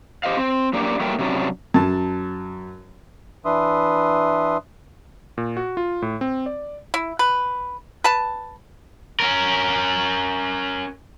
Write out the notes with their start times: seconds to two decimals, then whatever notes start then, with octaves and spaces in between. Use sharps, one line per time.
0.24 G4 C5 D#5 F5
0.37 C4
0.73 F#2 A#3 D4 G4 D5
1.00 F#3 G3 A3 A#3 A#4 G5
1.19 C3 F#3 C#4 D4
1.74 F#2 F#3 A5
3.45 E3 D4 B4 E5 C6 D#6
5.38 A#2
5.57 F#4
5.77 F4
6.02 A2
6.21 C4
6.46 D5
6.94 E4
7.19 B4
8.04 B4 A5
9.20 C#4 A#4